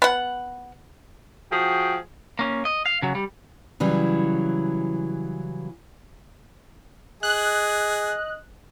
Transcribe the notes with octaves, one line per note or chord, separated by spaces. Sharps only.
B3 F#5
F3 F#4 G#4 G5
A#3 C#4
D#5
F5
C#3 F#3
G3
C#3 E3 F#3 G3
G#4 D#5 F#6